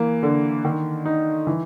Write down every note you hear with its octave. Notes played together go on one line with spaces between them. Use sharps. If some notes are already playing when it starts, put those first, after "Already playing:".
Already playing: E3 A#3
D3
D#3
D#4
E3